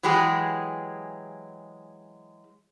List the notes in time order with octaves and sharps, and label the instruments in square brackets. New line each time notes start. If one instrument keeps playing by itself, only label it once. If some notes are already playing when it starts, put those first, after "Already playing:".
[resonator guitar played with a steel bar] E3 F#3 G#3 G4 G#4